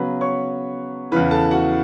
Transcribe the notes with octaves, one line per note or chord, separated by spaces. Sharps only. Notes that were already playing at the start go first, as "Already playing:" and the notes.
Already playing: C#3 F#3 B3 B4 B5
C#5 C#6
E2 C#3 E3 B4 B5
A4 A5
F#4 F#5